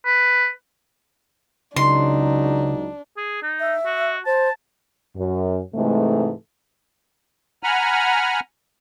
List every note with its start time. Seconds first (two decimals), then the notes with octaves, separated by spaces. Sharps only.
0.05 B4
1.76 C#2 C#3 F#3 D4 D#4 C6
3.17 G#4
3.42 D#4
3.60 E5
3.85 F#4
4.25 C5 A5
5.16 F#2
5.75 G#2 C3 E3 G#3 A3
7.63 F#5 G#5 A#5 B5 F6